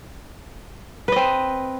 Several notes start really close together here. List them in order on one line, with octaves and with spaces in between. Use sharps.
B4 D#5 C4